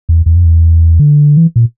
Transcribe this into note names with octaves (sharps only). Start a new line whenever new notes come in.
E2
E2
F2
E2
D3
E3
A#2